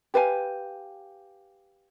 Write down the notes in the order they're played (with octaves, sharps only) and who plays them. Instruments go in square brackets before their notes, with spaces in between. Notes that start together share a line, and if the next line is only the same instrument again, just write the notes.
[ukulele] G4 B4 F5 G#5